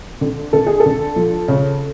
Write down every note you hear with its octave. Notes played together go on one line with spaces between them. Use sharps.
D3
D3 A4
G#4
A4
D3
F3
C#3